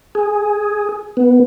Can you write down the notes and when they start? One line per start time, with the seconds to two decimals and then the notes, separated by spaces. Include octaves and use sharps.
0.15 G#4
1.17 B3